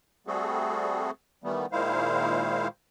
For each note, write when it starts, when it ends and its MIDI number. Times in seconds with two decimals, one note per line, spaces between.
0.27 1.11 55
0.27 1.11 57
0.27 1.11 60
0.27 1.11 66
0.27 1.11 68
0.27 1.11 69
1.44 1.66 51
1.44 1.66 52
1.44 1.66 55
1.44 1.66 57
1.44 1.66 59
1.72 2.68 46
1.72 2.68 51
1.72 2.68 56
1.72 2.68 64
1.72 2.68 72
1.72 2.68 77